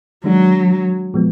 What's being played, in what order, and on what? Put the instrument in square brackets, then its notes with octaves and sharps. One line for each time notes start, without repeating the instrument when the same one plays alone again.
[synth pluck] D#3 G#3 D4 F#4 [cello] F#3
[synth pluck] A#2 F3 G#3 B3